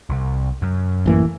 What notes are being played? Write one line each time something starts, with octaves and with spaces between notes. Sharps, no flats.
C2
F#2
A1 E3 A#3